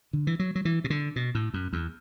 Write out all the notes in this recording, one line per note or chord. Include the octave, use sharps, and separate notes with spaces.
D3
E3
F#3
F#3
E3
B2
D3
B2
A2
F#2
E2